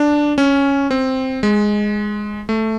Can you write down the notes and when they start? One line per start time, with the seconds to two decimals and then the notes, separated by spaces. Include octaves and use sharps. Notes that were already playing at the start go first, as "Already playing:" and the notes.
Already playing: D4
0.38 C#4
0.91 C4
1.43 G#3
2.49 A3